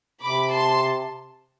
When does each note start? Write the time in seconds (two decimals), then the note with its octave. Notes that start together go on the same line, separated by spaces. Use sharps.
0.22 C3 B5 D6
0.52 A5 C6